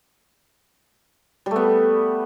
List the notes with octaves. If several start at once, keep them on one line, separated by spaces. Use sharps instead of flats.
G3 A3 B3